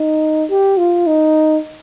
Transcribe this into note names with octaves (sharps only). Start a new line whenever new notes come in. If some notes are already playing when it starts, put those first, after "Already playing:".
Already playing: D#4
G4
F4
D#4